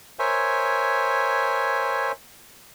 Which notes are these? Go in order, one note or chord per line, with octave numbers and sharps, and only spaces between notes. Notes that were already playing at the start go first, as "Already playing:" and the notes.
A#4 C5 C#5 E5 G#5